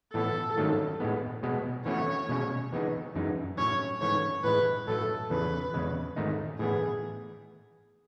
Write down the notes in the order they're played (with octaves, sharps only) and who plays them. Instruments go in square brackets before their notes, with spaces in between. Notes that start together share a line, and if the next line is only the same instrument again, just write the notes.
[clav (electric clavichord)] A2 E3 B3 [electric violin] A4
[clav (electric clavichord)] G#2 D#3 F#3 A3 C#4
A2 G#3 B3
B2 G#3 B3
[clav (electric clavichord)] E3 A3 C#4 F#4 B4 [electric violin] C#5
[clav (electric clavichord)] B2 G#3 C#4
E3 G#3 B3 D#4
F#2 E3 G#3 D#4
[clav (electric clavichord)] A2 F#3 C#4 [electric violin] C#5
[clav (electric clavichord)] G#2 E3 A3 C#4 [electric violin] C#5
[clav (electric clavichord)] A2 E3 G#3 [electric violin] B4
[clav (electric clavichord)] A2 F#3 A3 [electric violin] A4
[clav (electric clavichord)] E2 C#3 E3 [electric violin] B4
[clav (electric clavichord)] E2 C#3 G#3
G#2 D#3 A3 D#4
[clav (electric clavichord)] A2 E3 B3 [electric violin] G#4